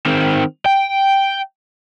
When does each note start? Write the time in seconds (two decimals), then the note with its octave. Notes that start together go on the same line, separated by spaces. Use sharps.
0.06 D#3 C4
0.66 G5